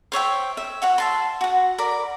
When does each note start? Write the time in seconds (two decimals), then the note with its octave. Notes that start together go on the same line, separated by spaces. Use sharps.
0.12 C5 C#5 E5 G5
0.57 E5
0.82 F#4 C#5 F#5
0.98 E5 A5 C6
1.41 F#4 F#5
1.78 A#4 D5 B5